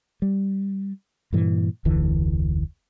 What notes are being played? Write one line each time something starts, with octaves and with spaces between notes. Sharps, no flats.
G3
G2 A#2 E3
F1 D2 D3 E3